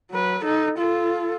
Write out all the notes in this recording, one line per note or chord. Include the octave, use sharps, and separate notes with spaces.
F#3 B4
D#4 A4
F4 A4